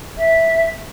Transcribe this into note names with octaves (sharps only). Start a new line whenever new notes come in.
E5